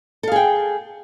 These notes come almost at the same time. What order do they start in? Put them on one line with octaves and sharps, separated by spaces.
A4 F5 G#4 G5